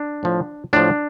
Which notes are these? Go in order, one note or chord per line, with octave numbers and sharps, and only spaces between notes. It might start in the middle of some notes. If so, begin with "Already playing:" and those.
Already playing: D4
A2 F3
A2 F3 D4